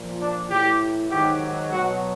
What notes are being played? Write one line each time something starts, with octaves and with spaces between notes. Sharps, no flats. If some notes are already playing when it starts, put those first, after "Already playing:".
Already playing: A#2 F3
D4
A2 E3 G4
G#2 D#3 F#3 G4
B2 F#3 F#4